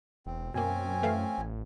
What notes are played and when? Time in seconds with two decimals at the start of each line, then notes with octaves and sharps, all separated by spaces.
0.26 E1 C4
0.54 F#2 B2 A#3 C4 C#4 G#5
1.03 E3 A3 F5
1.38 A1